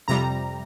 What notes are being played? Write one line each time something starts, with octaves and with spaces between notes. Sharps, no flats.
F2 C3 G3 A#5